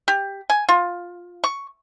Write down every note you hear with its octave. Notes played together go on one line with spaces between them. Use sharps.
G4
G#5
F4
C#6